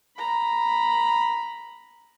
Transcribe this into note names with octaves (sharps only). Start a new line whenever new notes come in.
A#5 B5